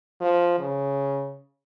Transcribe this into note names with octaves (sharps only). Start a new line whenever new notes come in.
F3
C#3